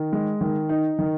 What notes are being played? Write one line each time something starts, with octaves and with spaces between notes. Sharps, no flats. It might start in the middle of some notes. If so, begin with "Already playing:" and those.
Already playing: D#3
G#3
D#3
D#4
D#3